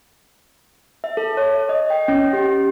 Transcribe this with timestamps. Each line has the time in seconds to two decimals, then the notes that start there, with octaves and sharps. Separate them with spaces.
1.04 E5
1.17 A4
1.37 C#5
1.69 D#5
1.90 G5
2.08 C#4
2.33 G4